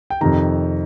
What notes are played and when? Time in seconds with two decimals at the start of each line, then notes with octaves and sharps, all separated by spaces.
0.10 G5
0.21 F2 C3 D#3 A#5